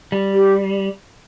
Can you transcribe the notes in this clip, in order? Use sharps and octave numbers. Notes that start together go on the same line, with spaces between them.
G3
G4